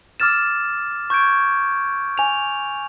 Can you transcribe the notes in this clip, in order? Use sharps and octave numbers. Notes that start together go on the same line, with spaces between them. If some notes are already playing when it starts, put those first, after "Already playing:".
D6 E6 F6 A6 E7
C#6 G6 G#6 D7
G#5 F7